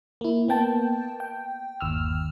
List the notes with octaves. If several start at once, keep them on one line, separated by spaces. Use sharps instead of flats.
A#3 E4
A#3 B3 G5 A5
G5
G1 D#2 E6 F6